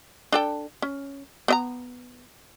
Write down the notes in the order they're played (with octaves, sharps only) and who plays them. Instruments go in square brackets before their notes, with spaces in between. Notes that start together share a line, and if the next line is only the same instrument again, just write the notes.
[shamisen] D4 A4 G5
C#4
B3 D#5 A#5